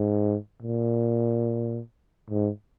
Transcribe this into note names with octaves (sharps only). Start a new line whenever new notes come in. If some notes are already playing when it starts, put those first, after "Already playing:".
Already playing: G#2
A#2
G#2